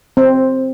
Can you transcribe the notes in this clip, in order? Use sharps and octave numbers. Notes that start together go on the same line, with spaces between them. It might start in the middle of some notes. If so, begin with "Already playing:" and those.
C4